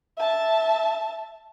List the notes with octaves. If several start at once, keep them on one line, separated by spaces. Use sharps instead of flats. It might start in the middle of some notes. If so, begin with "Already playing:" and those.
E5 A5